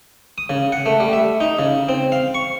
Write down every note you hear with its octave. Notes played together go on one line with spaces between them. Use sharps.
D#6
C#3
F#5
A3
G3
E5
D#4
C#3
C4
F5
C#6